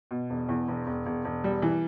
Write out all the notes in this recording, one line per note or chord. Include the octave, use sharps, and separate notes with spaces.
B2
E1
E2
E1
E1
E1
E1
G3
E3